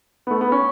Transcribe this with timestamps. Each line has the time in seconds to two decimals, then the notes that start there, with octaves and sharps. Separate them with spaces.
0.27 B3
0.31 A3
0.41 B3
0.52 C#4